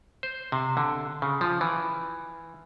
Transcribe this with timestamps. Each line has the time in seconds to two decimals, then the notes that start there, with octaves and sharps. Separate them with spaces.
0.23 C5
0.52 C3
0.77 D3
1.22 C#3
1.41 F3
1.61 E3